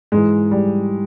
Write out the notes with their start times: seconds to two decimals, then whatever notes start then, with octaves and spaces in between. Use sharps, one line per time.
0.12 G#2 E3 G#3
0.51 G3